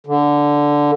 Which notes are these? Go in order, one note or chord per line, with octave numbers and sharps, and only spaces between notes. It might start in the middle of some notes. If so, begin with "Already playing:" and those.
D3